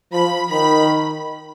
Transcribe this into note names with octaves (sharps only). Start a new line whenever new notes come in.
F3 B5
D#3 B5